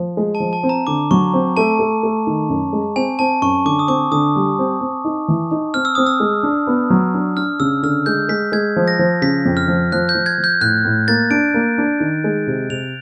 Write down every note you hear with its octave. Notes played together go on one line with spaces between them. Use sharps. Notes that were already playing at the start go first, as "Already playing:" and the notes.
Already playing: F3
G#3
A5
F3
A5
C4
A#5
D3 D6
F#3 C#6
C4
A3 A5
A3
A3
D#3
F#2
G#3
C4 G#5
C4 A5
F#2 C#6
D3 D6
D#6
C4 D6
D3 D#6
G3
C4
C4
D#4
E3
D#4
C4 F6
E6
C4 D#6
E6
G#3
D4
B3
F#3
D4
D4 F6
C#3 E6
D3 F6
G#3 G6
G#3 B6
G#3 G#6
F3
A#6
F3
C#3 B6
F2
F6
F3
F3 F#6
G6
F3
G#6
F3
G6
A2 F#6
A2
A#3 A6
D4 D7
A#3
D4
D#3
G#3
C3
C3 F7